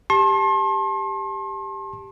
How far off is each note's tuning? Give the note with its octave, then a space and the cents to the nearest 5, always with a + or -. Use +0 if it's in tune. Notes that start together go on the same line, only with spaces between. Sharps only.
G4 +5 A5 +0 C6 +40